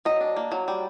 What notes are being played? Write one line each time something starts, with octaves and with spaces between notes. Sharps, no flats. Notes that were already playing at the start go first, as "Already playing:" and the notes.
F#3 D#5
D4
A#3
F#3
G3